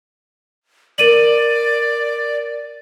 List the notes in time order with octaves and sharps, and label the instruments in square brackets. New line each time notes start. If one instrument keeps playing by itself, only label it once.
[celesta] A#4 D#7 F#7 [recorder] D5